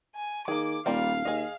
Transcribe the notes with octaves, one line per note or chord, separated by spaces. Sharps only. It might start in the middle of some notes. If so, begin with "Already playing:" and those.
G#5
D#3 A#3 G#4 D6
D#1 G3 A#3 F4 F5
D#2 G#4 D#5